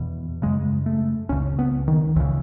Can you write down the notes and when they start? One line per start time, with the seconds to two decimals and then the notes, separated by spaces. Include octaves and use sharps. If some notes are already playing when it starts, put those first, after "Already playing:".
Already playing: E2 B2
0.42 F#2 C#3 G#3
0.86 A3
1.29 C#2 C#3 C#4
1.59 B3
1.88 D#3
2.16 C#2 C#3 E3